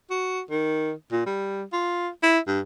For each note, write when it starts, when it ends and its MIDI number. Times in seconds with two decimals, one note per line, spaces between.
0.10 0.41 66
0.51 0.92 51
1.12 1.25 46
1.26 1.63 55
1.73 2.08 65
2.23 2.39 64
2.47 2.60 43